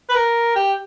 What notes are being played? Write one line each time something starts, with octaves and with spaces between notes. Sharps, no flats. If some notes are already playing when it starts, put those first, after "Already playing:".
B4
A#4
G4